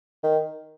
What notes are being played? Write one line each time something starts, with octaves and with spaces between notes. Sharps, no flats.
D#3